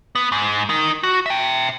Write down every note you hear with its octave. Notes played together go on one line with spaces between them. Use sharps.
B3
G#2
D#4 A#4
F#4
E5 G5